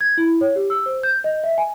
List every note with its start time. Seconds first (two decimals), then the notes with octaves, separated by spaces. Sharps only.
0.01 G#6
0.18 E4
0.41 C#5
0.56 G4
0.70 E6
0.86 C5
1.03 G6
1.24 D#5
1.44 E5
1.58 G#5